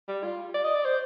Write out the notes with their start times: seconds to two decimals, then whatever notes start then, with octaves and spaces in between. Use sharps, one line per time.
0.08 G3
0.24 F4
0.54 D5
0.64 D#5
0.75 D5
0.85 C5